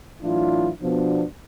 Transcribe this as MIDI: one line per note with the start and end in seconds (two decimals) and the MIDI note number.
0.22 0.69 45
0.22 0.69 52
0.22 0.69 54
0.22 0.69 62
0.22 0.69 64
0.22 0.69 65
0.81 1.24 47
0.81 1.24 53
0.81 1.24 59
0.81 1.24 62